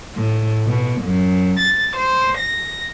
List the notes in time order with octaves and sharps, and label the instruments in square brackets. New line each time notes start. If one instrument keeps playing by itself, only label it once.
[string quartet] A2
B2
F#2
A6
C5
A#6